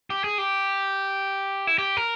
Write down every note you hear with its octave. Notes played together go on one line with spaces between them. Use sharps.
G4
G#4
G4
E4
G4
A#4